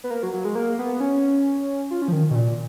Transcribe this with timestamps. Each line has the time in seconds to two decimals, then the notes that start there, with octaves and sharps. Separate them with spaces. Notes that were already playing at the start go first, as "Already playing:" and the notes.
0.04 B3
0.11 A#3
0.23 F#3
0.33 F#3
0.45 G#3
0.55 A#3
0.79 B3
1.00 C#4
1.91 F4
2.02 C#4
2.08 F3
2.12 D#3
2.31 B2
2.35 A#2